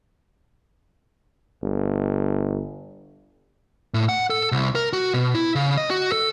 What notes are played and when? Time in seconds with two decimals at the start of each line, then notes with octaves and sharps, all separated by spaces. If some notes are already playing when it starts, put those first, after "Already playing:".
1.63 G1
3.94 A2
4.09 F#5
4.30 A4
4.52 C2
4.75 A#4
4.93 F#4
5.14 B2
5.34 E4
5.55 C#3
5.77 D#5
5.90 F#4
6.12 A4